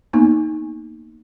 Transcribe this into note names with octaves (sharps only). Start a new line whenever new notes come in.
A#3 B3 D#4